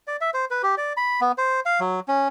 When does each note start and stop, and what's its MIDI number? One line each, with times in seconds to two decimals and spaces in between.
0.07 0.17 74
0.21 0.30 76
0.34 0.45 72
0.51 0.62 71
0.63 0.75 67
0.78 0.93 74
0.97 1.20 83
1.21 1.32 59
1.38 1.60 72
1.66 1.80 77
1.80 2.00 54
2.08 2.28 61